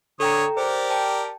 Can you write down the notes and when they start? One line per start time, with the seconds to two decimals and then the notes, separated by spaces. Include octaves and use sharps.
0.20 D3 A4 C#5 G5 A#5 D#6
0.57 G4 A#4 C5 D5
0.90 G5 A5